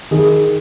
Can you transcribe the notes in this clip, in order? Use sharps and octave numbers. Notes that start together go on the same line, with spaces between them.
D#3 G#4